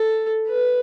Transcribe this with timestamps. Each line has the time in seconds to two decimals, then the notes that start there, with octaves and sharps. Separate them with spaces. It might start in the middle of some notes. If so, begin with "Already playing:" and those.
Already playing: A4
0.48 B4